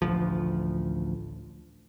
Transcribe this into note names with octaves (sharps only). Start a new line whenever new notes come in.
A1 D2 F3